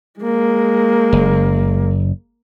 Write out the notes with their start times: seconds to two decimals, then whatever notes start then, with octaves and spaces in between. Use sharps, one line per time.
0.20 G#3 A#3
1.13 F#1